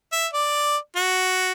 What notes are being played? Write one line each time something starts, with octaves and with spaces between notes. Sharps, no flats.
E5
D5
F#4